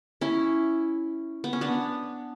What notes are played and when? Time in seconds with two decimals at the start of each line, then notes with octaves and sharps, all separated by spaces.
0.21 C#4 E4
1.44 B3
1.53 C#4
1.61 B3 D4